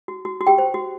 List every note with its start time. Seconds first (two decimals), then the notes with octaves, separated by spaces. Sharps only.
0.08 F#4
0.25 F#4
0.41 F#4
0.47 G4 G5
0.58 C5
0.74 F#4